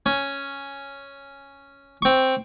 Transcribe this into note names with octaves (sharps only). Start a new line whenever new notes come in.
C#4
C4 C#6